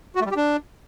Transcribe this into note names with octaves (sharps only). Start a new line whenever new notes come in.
F#4
A3
G3
G4
D4